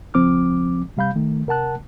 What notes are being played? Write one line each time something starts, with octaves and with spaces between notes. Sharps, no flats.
C#2 F3 C4 D6 F6
C3 G3 F5 B5 G6
D#3 A3
C3 A#4 F#5 A5 F#6